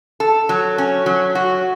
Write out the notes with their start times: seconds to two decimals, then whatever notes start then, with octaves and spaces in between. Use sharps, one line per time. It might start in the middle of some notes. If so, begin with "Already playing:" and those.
0.20 A4
0.49 F#3
0.78 C#4
1.06 F#3
1.35 F#4